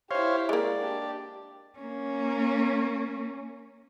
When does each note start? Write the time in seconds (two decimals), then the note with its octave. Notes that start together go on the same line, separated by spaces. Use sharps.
0.11 E4 G4 C5 C#5 F5
0.49 G#3 A#3 D5
0.81 D4 G4
1.79 A#3 C#4